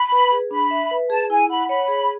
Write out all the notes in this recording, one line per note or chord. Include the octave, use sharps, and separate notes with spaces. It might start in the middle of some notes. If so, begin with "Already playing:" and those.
Already playing: B5
B4
G#4
D4 B5
E5
B4
G#4 A5
E4 G#5
F#5 B5
C#5 B5
G#4